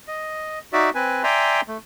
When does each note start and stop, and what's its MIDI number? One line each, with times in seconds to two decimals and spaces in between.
0.08 0.59 75
0.73 0.90 63
0.73 0.90 66
0.73 0.90 74
0.73 0.90 76
0.95 1.23 60
0.95 1.23 71
0.95 1.23 80
1.23 1.61 74
1.23 1.61 76
1.23 1.61 79
1.23 1.61 80
1.23 1.61 82
1.23 1.61 84
1.68 1.78 57